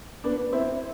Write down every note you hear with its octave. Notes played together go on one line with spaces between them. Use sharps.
B3 D4
C4 E4